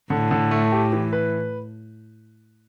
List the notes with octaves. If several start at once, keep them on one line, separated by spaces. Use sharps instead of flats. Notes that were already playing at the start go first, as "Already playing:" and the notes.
A2 D3
D3
A3
G4
E3
B4